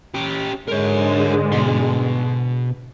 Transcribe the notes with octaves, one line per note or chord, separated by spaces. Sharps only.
C#4 G4
G#2 D3 G#3 A#4 C#5
B2 C6